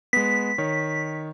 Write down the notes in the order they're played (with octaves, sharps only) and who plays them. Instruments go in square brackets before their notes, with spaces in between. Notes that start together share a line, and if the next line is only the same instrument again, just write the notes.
[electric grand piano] G#3 B3 [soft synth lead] B6
[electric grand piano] D#3 C#5